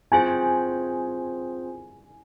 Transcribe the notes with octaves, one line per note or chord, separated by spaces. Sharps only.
C4 F4 G#4 C5 G#5